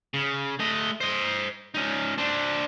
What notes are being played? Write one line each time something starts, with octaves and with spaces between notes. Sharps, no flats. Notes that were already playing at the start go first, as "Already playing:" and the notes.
C#3
A3 D#5
C5 D#5
C#4 D#4
D4 C5